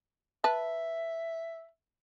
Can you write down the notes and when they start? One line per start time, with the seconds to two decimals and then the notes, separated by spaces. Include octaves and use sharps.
0.44 B4 E5 A5